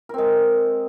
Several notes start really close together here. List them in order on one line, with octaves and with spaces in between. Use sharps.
A#4 C4 G#3